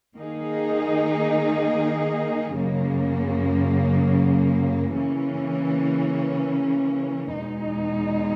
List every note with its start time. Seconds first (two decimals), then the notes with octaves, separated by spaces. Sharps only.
0.17 D#3 A#3 D#4 G#4
2.56 F#2 C#3 F#3 A#3
4.96 C#3 E3 A#3 C#4
7.35 E2 B2 G#3 D#4